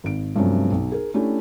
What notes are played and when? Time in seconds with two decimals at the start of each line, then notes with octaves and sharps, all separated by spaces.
0.04 G#1 D7
0.36 G2 C3 F3 F#3 A3 C#4
0.72 B1
0.92 G#4 A#4
1.14 A3 C#4 D4 E4 G4